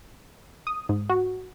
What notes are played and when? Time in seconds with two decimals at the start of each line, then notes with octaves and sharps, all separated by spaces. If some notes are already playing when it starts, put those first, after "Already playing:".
0.67 D#6
0.89 G#2
1.09 F#4